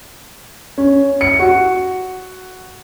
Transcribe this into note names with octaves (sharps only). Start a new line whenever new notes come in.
C#4
C#7
F#4